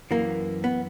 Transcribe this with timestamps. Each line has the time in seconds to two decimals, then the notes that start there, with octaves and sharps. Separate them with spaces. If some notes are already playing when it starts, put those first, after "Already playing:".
0.11 F#2 E3 A#3
0.64 B3